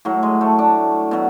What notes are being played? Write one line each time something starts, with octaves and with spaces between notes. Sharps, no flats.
A2 F#3
G#3
A3
D4
B2 F#3